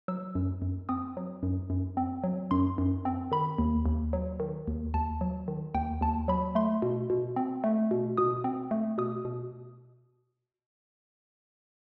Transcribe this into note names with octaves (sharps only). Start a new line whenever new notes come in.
F#3 E6
F#2
F#2
C4 D#6
F#3
F#2
F#2
C4
F#3
F#2 C6
F#2
C4
D#3 B5
D#2
D#2
F#3
D#3
D#2
D#2 A5
F#3
D#3
D#2 G5
D#2 A5
F#3 B5
A3 C6
B2
B2
C4
A3
B2
B2 D#6
C4
A3
B2 D#6
B2